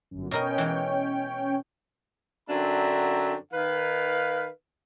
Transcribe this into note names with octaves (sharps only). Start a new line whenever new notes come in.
G1 F#2
B2 C#4 A#4 C#5 D#5 G5
E3 G#3
F#2 D3 C4 D4 E5 A#5
D#3 B4 F5